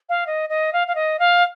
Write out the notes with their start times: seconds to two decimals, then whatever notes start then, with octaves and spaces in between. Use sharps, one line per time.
0.09 F5
0.27 D#5
0.49 D#5
0.73 F5
0.87 F5
0.95 D#5
1.19 F5